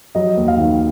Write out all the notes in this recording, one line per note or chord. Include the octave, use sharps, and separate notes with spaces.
F#3 D#5
D#2
F5
D#3